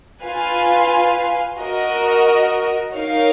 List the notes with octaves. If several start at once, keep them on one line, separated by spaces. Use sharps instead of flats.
F4 B4 F5 G#5
F#4 A#4 D#5
D#4 A#4 C#5 F5